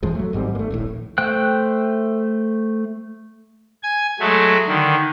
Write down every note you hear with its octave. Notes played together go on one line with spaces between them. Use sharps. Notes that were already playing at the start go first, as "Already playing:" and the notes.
F2 E3 F3 G#3
F#3 A3
G#1 G#2 G3 C4
A3 A#3
D#1 A#1 A2
A3 C5 G5 F#6
G#5 G#6
F#3 G#3 A3
D3 D#3